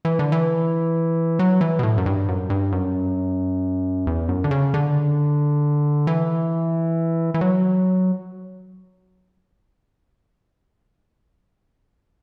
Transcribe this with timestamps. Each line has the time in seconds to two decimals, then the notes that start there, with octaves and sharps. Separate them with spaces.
0.05 E3
0.19 D3
0.32 E3
1.39 F#3
1.61 E3
1.79 B2
1.83 A2
1.98 F#2
2.06 G2
2.28 F#2
2.50 G2
2.72 F#2
4.07 E2
4.29 F#2
4.44 D3
4.51 C#3
4.74 D3
6.07 E3
7.34 E3
7.41 F#3